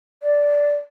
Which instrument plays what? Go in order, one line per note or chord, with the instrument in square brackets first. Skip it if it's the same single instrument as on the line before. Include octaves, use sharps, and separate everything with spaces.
[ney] D5